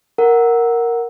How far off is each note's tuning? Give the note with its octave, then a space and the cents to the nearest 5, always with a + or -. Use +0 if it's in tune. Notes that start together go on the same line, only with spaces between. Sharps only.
A#4 +0 F#5 +0